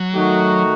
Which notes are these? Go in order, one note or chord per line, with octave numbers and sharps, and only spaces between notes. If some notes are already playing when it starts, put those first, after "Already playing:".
Already playing: F#3
D#3 A3 D#4 F#4